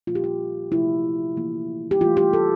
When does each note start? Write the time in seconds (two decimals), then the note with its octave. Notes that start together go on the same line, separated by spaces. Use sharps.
0.07 A#2 F3 A#3 F4
0.15 G4
0.24 F4
0.72 C3 F3 A3 E4
1.36 E3 A#3
1.91 G4
2.01 E3 A3 F4
2.17 G4
2.33 A4